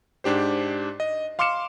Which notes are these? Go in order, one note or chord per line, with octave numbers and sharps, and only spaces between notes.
G#2 D4 G4 C5
D#5
F5 C6 D6 F6 C#7 E7